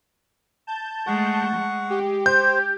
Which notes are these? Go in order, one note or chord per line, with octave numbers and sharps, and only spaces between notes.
A5 G6
G#3 A3 F#5 C#6
G#3
G4
C5 G6